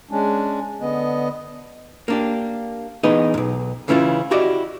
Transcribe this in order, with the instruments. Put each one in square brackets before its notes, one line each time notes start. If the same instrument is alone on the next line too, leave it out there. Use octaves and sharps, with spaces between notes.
[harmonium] G#3 C#4 D4
D3 B3 D#5
[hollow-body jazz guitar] A#3 D4 G4
E3 B3 D#4 G#4 D#5
B1 F#2
C#3 E3 C#4 E4 F4
E4 F#4 G4 D5 D#5